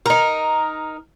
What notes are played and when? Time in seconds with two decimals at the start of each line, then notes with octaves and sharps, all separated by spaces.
0.06 D#4 A#4